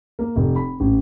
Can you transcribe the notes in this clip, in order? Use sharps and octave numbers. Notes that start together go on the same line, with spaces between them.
A#3
F1
B5
A1